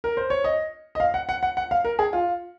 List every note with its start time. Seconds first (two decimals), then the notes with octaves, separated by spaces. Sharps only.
0.04 A#4
0.17 C5
0.30 C#5
0.44 D#5
0.95 D#5
1.00 F5
1.14 F#5
1.29 F#5
1.43 F#5
1.57 F#5
1.71 F5
1.85 A#4
1.99 G#4
2.13 F4